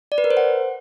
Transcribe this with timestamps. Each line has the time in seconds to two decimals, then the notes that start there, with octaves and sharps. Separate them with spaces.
0.12 D5
0.18 B4
0.24 A#4
0.31 C5
0.37 F#5